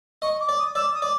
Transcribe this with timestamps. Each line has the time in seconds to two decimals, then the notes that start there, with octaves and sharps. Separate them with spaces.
0.22 D#5 C#6
0.40 D6
0.49 D5
0.58 D#6
0.75 D5 E6
0.94 D#6
1.02 D5